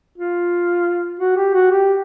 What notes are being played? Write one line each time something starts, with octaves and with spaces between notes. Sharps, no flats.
F4
F#4
G4
F#4
G4